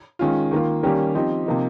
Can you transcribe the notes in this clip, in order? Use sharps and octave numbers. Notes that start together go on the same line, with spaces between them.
D#3 G#3 C#4 F4
D#3 A#3 F4
D#3 G3 A#3 C#4 G4
F3 C4 D#4 G4
C3 F3 A#3 D#4